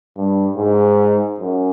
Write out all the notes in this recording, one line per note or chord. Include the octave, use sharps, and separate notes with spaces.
G2
G#2
F#2